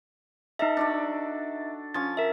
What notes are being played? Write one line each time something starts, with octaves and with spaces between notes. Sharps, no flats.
D#4 A4 D#5 E5
D4 F#4 D5
F3 C#4 A6
A#4 E5